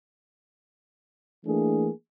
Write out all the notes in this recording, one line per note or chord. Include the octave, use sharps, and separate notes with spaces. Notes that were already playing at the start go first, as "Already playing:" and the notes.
E3 A3 A#3 D4 G#4